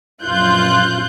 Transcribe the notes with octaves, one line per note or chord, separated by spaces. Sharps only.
A#1 F#2 F4 F#6 G6